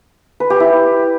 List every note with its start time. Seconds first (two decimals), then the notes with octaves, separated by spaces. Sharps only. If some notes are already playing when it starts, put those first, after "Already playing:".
0.40 B4
0.50 G4
0.60 E4